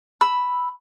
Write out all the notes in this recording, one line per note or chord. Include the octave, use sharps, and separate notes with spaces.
B5 E6